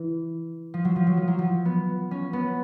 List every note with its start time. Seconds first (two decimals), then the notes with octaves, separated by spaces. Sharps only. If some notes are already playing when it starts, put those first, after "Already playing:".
Already playing: E3
0.74 F3
0.85 F#3
0.96 F3
1.07 F#3
1.17 F3
1.28 F#3
1.39 F3
1.65 B3
2.11 C#4
2.33 B3